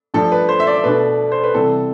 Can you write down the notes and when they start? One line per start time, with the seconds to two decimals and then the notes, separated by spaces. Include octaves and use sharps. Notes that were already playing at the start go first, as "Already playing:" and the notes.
0.14 G2 F3 A3 D4 A4
0.32 B4
0.49 C5
0.60 E5
0.67 D5
0.84 B2 A3 D4 B4
1.32 C5
1.44 B4
1.54 C3 E3 G3 C4 A4